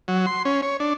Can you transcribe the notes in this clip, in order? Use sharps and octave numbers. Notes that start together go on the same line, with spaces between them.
F#3
C6
C#4
C#5
D4